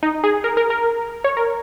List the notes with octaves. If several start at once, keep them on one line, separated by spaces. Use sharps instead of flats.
D#4
G#4
A#4
A#4
A#4
C#5
A#4